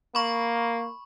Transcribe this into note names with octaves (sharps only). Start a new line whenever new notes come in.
A#3 B5 C#6